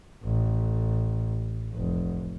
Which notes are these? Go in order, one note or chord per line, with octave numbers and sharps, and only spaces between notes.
A1
F1